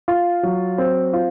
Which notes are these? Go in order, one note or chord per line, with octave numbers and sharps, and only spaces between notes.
F4
F#3
C4
F4